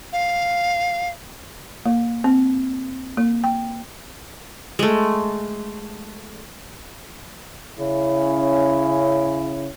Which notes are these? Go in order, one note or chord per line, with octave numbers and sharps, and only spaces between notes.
F5
A#3
C4
A#3
G5
G#3 A3
C#3 C#4 E4